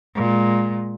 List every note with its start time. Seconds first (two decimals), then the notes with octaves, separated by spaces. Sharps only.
0.15 A#2 G#3